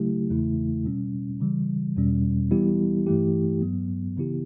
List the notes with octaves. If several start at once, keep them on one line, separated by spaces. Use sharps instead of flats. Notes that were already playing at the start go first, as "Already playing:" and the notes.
Already playing: C#3 F#3 A3 E4 G4
E2 C#3 E3 A3 E4
B2 G3 C#4
C#3 E3 G3
E2 B2 G3 C#4
E3 G3 B3 E4 G4
G2 E3 A3 E4 G4
G2 F#3 B3
C#3 E3 B3 E4 G4